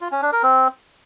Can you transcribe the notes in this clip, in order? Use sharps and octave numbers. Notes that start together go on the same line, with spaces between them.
F4
C#4
D4
A#4
C4